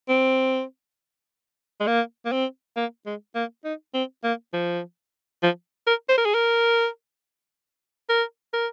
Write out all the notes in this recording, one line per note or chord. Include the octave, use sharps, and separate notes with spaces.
C4
G#3
A#3
A#3
C4
A#3
G#3
A#3
D#4
C4
A#3
F3
F3
A#4
C5
A#4
G#4
A#4
A#4
A#4